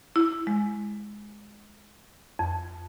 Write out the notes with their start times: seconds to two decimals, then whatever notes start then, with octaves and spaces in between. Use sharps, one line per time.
0.16 E4
0.47 G#3
2.39 F2